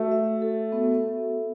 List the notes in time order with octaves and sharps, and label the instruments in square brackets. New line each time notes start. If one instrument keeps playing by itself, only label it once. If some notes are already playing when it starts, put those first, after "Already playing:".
Already playing: [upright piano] A3 [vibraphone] F#4
[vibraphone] E5
A4
B3